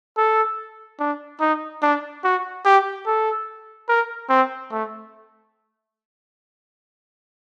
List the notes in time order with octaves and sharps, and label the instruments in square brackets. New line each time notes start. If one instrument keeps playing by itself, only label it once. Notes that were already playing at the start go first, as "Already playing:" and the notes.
[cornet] A4
D4
D#4
D4
F#4
G4
A4
A#4
C4
A3